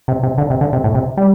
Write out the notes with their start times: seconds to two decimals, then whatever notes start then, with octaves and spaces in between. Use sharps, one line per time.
0.08 C3
0.23 C3
0.38 D3
0.50 C3
0.61 D3
0.73 C3
0.84 A2
0.94 C3
1.17 G3